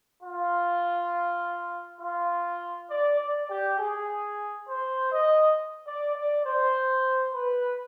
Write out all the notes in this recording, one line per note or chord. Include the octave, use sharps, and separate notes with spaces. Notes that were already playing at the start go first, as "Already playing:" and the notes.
F4
F4
D5
D5
G4
G#4
C5
D#5
D5
D5
C5
B4